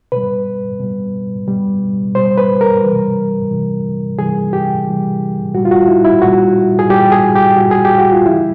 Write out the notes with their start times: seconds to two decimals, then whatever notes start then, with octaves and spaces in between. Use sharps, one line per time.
0.12 B2 G3 B4
0.80 B2 G3
1.47 B2 G3
2.15 B2 G3 C5
2.38 B4
2.61 A#4
2.83 C3 E3 G3
3.51 C3 E3 G3
4.19 C3 E3 G3 G#4
4.53 G4
4.87 C3 E3 G3
5.54 A#2 G3 F#4
5.65 F4
5.71 F#4
5.88 E4
6.04 E4
6.22 A#2 G3 F#4
6.79 G#4
6.90 A#2 G3 G4
7.12 G#4
7.35 G4
7.57 A#2 G3 F#4
7.71 G#4
7.85 G4
7.98 F#4
8.12 F4
8.25 C#3 E3 G3 E4